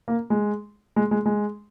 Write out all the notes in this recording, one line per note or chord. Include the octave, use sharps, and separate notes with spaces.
A#3
G#3
G#3
G#3
G#3